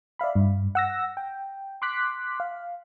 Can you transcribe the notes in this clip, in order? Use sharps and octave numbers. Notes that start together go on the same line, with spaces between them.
D5 E5 F5 B5
G2
F#5 E6 A#6
G5
C6 D6 F#6 B6
F5